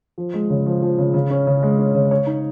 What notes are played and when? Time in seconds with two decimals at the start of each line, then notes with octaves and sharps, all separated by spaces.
0.18 F3
0.34 G#3
0.50 C#3
0.66 F3
0.82 F3
0.99 C#3
1.14 C#3
1.30 C#4
1.47 C#3
1.63 G#3
1.79 C#4
1.95 C#3
2.11 C#5
2.27 D#4